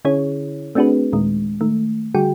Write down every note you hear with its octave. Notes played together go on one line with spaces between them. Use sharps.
D3 C#4 E4 G#4 C#5
A3 C4 D4 F#4 G#4 B4
D#2 A#2 D#3 G#3
D#3 A3
D3 G3 F#4 G#4 G5